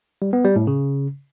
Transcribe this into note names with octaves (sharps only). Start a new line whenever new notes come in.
G3
B3
G3
A2
C#3